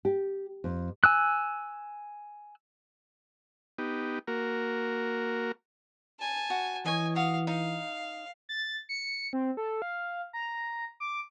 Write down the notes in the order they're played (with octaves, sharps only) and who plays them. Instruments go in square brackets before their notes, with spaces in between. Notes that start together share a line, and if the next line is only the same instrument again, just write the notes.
[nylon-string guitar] G4
F2
[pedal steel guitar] G#5 E6 F#6
[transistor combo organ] B3 D#4 G4
A#3 F#4 A#4
[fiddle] G#5 A5
[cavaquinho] F#4
[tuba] E3 [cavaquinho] C#5 D#5 [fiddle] G#5
[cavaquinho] F#4 D#6 [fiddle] F5
[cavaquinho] D#4 [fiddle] F5
[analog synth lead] A6
C#7
C4
A4
F5
A#5
D6